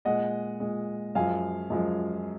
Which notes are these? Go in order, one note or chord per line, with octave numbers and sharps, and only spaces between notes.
A#2 G#3 D#5 F#5
A#2 G#3
F#2 F3 G#3 F5 G#5
F#2 F3 G#3